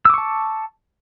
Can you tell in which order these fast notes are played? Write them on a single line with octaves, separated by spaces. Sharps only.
E6 D6 C#6 A5